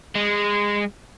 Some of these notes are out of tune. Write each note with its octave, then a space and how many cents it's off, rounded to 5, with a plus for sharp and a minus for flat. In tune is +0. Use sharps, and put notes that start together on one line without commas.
G#3 -20